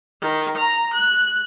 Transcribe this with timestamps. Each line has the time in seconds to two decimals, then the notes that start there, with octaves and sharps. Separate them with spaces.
0.21 D#3
0.57 A#5
0.93 F#6